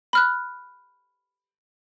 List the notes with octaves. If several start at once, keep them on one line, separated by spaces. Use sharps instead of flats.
B5 F6 F#6